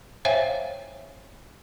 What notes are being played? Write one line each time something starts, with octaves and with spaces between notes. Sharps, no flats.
C5 C#5 E5 F5 G5 G#5